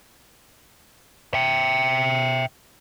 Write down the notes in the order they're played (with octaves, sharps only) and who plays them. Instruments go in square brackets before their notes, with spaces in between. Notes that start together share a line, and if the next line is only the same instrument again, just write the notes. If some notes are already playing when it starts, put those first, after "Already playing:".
[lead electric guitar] E5 G5